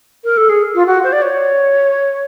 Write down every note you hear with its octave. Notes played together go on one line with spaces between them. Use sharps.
A#4
A4
G#4
F4
F#4
C5
D5
C#5